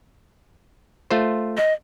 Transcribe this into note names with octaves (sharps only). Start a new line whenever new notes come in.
A3 F4 C5
D#5